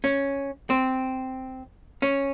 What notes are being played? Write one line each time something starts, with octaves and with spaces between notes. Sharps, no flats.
C#4
C4
C#4